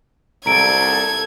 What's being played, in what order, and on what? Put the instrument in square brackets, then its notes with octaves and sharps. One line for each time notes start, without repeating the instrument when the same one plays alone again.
[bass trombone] C2 [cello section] A4 [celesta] A#5 D7 [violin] G#6